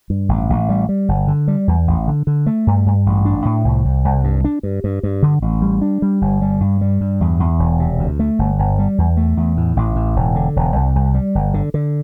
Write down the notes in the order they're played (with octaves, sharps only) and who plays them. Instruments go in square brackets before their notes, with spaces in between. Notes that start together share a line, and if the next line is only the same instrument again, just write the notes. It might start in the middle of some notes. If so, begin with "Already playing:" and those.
[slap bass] G2
A1
A1
G3
G3
G1
D3
G3
E2
A1
D3
D3
A3
G2
G2
A1
D4
A2
C2
C2
C2
G2
D4
G2
G2
G2
D3
A1
G3
D4
G3
G1
G3
G2
G3
G2
E2
E2
E1
C3
D2
A3
G1
G1
G3
E2
A3
E2
A2
A1
A2
E1
D3
E1
C2
C2
G3
G1
D3
D3